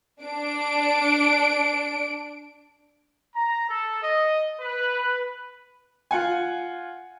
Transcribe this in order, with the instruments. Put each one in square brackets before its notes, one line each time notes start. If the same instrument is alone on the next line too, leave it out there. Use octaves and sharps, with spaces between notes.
[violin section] D4 D7
[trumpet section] A#5
A4
D#5
B4
[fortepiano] F4 F#5 G#5